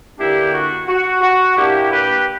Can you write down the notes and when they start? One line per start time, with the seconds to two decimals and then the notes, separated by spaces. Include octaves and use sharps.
0.18 D3 A#3 D4 E4 G4
0.53 F#4
0.87 F#4
1.21 F#4
1.56 A#2 A#3 D4 E4 G4
1.90 G4 B4